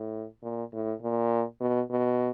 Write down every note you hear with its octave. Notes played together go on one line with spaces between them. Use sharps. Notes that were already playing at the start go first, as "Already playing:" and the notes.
Already playing: A2
A#2
A2
A#2
B2
B2